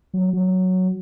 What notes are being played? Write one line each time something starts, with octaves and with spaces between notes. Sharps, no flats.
F#3
F#3